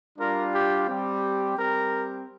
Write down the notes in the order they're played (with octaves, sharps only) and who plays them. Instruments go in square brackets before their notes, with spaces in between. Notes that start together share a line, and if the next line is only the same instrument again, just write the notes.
[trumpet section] G3 D4 F4 A#4
G4
G3 C4 G4
G3 C4 G4 A#4